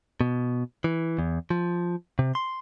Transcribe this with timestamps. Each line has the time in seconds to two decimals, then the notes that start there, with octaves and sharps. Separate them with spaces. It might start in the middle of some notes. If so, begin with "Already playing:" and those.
0.21 B2
0.84 E3
1.19 E2
1.50 F3
2.19 C3
2.35 C6